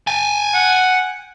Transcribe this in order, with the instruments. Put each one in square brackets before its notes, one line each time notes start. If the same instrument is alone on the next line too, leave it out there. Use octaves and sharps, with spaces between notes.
[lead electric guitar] G5 G#5
[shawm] F#5